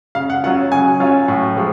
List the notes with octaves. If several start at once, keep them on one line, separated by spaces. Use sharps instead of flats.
C#3 F5
F#5
F#3 C#4 F4 F#5
C#3 G#5
F#3 C#4 F4
A2
F3 G#3